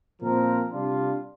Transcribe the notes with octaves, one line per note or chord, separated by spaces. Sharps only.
A#2 F3 C4 A#4
C3 G3 D4 F4